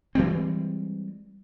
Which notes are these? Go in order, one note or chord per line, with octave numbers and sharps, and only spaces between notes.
E3 G3 G#3 C4